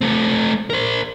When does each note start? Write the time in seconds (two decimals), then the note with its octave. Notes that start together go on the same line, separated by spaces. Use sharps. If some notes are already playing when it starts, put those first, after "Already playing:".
0.01 A3 C4
0.70 A#4 C5